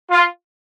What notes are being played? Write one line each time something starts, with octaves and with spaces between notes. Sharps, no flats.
F4